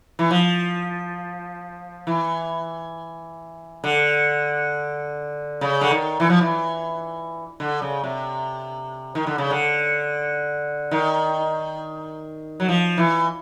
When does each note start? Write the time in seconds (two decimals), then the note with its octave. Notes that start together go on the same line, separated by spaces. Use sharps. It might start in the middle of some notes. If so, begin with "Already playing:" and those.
0.19 E3
0.31 F3
2.07 E3
3.84 D3
5.61 C#3
5.81 D3
5.91 D#3
6.20 E3
6.30 F3
6.41 E3
7.60 D3
7.82 C#3
8.04 C3
9.15 D#3
9.27 D3
9.38 C#3
9.51 D3
10.91 D#3
12.60 F#3
12.69 F3
12.98 E3